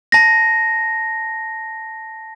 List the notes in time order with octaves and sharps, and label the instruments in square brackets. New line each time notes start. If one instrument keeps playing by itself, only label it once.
[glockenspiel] A5 A#6